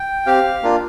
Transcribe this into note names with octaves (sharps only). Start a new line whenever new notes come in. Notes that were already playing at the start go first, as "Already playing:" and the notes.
Already playing: G5
C4 G4 F5
A#3 D4 F4